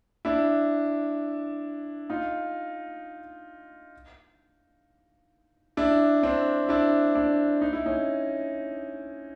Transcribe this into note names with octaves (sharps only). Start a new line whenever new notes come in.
D4 E4
D#4 F4
D4 E4
C4 D4
D4 E4
D4 E4
D#4
E4
C#4 D#4